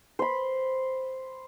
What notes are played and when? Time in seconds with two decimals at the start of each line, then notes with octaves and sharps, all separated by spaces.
0.19 C5 B5